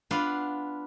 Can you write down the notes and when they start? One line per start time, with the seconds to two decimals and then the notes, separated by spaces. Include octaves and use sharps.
0.11 B3 D4 F4 B4 F5